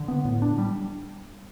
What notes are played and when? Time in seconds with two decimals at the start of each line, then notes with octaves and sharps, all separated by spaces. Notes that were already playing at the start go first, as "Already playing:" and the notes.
Already playing: D3
0.08 B3
0.25 A2
0.42 D4
0.58 G3